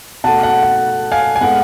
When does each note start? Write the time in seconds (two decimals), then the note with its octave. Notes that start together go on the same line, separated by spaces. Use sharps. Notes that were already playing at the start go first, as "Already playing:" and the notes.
0.24 B2 A3 F#5 A5
0.43 F#5
0.63 F#5
1.12 F5 G#5
1.36 G#5
1.41 A2 G#3 B3 F#5